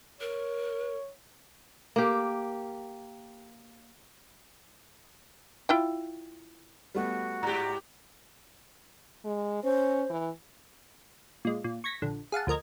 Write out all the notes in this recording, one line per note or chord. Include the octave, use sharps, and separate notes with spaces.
A#4 C#5
A#3 G4
E4 F4 G5
G3 A3 B3 F#4
G#2 G4 A#5
G#3
C#4 C5
E3
A#2 G#3
A#2
C#6 G#6 A#6 B6
A#1 D3
G#4 F5 F#5 A5
D2 F3 A#4 D#5 G#6